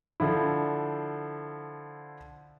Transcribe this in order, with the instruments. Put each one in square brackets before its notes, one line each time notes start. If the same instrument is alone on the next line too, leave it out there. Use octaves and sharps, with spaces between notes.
[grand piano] D3 F3 E4